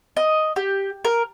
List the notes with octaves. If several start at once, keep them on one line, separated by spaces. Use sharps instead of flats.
D#5
G4
A#4